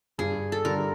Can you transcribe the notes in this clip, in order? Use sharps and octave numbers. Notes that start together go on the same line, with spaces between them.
G2 G#4
A4
D3 G3 A#4